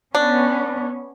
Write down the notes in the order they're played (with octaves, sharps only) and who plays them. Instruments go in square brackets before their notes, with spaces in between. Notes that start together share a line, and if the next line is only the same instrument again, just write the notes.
[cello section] B3 C#4 [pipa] D4